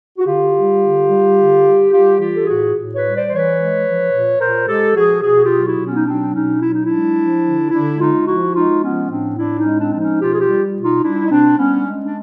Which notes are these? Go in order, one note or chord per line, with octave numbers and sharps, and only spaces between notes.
F#4
D3 F4 G4
G3
D3
G3
D3
G3
G3 F4 G4
E3 F4 G4
A4
A2 F#4 G#4
A2
B4 C#5
G3
C5 D5
E3 C5
B4 C#5
G#3
F3
A#2
A#2 A#4 C5
G#3 G4 A4
F3 F#4 G#4
B2 F#4 G#4
F#4
F4 G4
F#3
E4 F#4
B2
B3 C#4
D#4
F#3 C4 D4
B2 C#4 D#4
F#3 E4
D#4
G#3 D4 E4
F3
D3
D3 D4 E4
G#3 D#4 F4
F3 E4 F#4
G#3 D#4 F4
F3 B3 C#4
A2 C4 D4
A2 D4 E4
C#4 D#4
G#3
C4 D4
F3 D4
C#4 D#4
B2 F4 G4
G#4
F4 G4
G3
B2
D#4 F4
G3 D4 E4
D#4
B2 C4 D4
G3 B3 C#4
G#3
D4